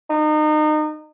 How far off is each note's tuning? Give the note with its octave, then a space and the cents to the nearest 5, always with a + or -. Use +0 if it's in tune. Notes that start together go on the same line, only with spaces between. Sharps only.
D#4 -30